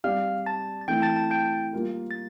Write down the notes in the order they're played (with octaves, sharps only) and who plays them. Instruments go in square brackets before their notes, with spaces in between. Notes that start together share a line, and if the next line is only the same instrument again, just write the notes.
[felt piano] G3 C4 G4 D5 [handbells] F5 F6
[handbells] A5 A6
A6
[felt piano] E3 A3 C4 [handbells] G5 G6
[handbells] A5 A6
A5 A6
G5 G6
[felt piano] G3 A#3 F4 A#4
[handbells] A6